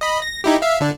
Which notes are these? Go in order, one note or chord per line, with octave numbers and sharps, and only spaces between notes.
D#5 B5
A#6
D#4 E4 G4
E5 F5
D3 D4